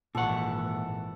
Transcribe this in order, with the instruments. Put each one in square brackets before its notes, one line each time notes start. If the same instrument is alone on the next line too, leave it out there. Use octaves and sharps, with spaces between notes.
[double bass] G#1 E3 [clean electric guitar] A#2 F#5 [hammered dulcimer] A4 C#6